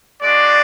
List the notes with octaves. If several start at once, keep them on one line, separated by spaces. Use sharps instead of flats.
G#3 D4 F#4 D5